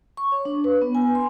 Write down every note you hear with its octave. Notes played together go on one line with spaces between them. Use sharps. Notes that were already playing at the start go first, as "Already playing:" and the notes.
C#6
C#5
D4
B4
B3
G#5
C6